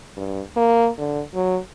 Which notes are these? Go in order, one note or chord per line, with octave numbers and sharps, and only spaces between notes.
G2
A#3
D3
F#3